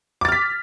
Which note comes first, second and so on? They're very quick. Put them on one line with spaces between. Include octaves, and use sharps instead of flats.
D6 A6 F6 B6